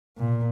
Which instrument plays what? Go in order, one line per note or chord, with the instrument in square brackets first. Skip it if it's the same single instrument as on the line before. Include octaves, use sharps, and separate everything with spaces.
[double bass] A#2